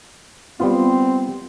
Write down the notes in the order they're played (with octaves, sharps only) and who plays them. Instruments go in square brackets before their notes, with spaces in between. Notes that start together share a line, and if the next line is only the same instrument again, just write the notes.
[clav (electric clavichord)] G3 B3 F4 [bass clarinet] C4